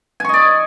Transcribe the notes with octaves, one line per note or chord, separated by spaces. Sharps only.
D5 D#5 G#5 C#6